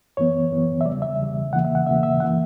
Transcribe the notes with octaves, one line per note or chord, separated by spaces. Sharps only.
F#2 E3 B3 C#5
F#2 E3 B3
E5
E2 C#3 G3 D5
E5
E2 C#3 G3
E2 C#3 E3 A#3 F#5
E5
F#5
E2 C#3 E3 A#3 E5
E5
F#2 E3 A#3 F#5